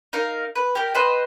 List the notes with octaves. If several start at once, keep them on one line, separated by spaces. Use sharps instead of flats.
D#4 A#4 F5
B4
G4 A#4
B4 C5 D#5